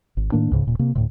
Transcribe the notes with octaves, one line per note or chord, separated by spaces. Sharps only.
G#1
A2 D#3 A#3 D4
C#2 G#2 C#3
D#1 A#2
C3 A#3
D2 A2 C3